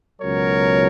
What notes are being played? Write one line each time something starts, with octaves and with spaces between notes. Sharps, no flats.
C#2 B2 F#3 A#4 C#5